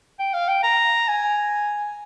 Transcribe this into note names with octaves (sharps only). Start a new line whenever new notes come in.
G5
F5
G5
A#5
G#5